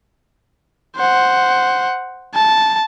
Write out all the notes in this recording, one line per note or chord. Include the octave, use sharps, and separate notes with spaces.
C5 F#5
A5